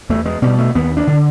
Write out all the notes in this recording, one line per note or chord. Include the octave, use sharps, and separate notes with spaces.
E2 A3
G#3
B2 G3
A3
D#2 B3
D4
D3